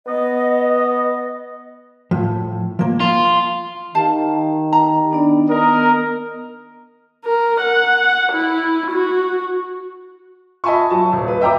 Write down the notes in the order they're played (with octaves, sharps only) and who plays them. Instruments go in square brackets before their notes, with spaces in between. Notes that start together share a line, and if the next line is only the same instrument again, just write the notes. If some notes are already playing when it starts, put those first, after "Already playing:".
[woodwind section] B3 D#5
[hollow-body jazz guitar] A2 F3
F3 A#3
[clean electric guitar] F4 [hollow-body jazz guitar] A5
[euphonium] D#3 [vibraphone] G4 [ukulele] F5 A5
[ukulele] A#5
[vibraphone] B3 D4 D5
[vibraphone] B3 [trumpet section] A#4 D#5
[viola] A#4
F#5
E4
F#4
[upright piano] D#5 E5 G#5 A5 B5 C#6
F#3 A5
D#1
B4
D#5 E5 G5 A#5 D6